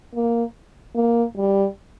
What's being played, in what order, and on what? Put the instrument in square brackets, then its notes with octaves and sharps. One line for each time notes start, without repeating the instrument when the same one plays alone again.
[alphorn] A#3
A#3
G3